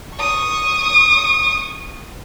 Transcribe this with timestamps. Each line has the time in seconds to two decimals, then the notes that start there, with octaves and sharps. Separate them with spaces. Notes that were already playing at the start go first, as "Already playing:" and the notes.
0.16 C#6 D#6